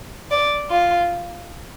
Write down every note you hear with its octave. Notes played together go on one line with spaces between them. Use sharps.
D5
F4